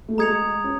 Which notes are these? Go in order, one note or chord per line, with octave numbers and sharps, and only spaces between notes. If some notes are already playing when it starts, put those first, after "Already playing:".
A3
G#3 A#5 D#6 G#6 C#7 F7
C#4